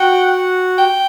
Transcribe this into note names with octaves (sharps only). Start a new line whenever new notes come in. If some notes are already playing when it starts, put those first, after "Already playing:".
Already playing: F#4 F#5 G5
G5